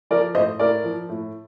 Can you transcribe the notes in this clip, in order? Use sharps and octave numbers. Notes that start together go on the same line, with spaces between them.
F3 A#4 D5
A2 C5 D#5
A2 A#4 D5
F3
A2